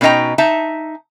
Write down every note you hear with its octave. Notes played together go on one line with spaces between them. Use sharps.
B2 C#4 D#4 D#5 G5 A#5
D#4 E5 A5